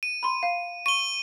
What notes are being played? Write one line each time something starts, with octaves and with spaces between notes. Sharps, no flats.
D#7
B5 C6
F5
C#6 D#7 G7